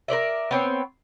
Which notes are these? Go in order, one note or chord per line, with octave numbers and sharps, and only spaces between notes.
A#4 C5 D5 E5
B3 C4 C#5